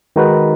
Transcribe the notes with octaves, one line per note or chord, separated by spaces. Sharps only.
D#3 G#3 D#4 F#4 B4